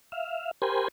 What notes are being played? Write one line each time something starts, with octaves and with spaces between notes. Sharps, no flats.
E5 F5
G4 A#4 C5 G#5 B5 C6